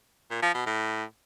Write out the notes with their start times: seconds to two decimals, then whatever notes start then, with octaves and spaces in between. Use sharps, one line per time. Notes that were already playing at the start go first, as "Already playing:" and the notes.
0.30 A#2
0.42 F3
0.54 B2
0.66 A2